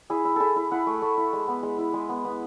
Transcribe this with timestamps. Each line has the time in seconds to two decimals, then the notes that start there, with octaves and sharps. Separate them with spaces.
0.10 E4 G#4
0.25 E4
0.36 E4 G#4 A4
0.56 E4
0.71 E4 F#5
0.87 A3
1.02 A3
1.17 E4
1.33 G#3
1.48 B3
1.63 G#3
1.78 E4
1.94 G#3
2.09 B3
2.25 B3